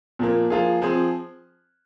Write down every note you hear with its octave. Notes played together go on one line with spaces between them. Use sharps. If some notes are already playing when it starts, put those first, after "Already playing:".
A#2 F3 A#3
F3 A#3 F4 G#4
F3 C4 G#4 C5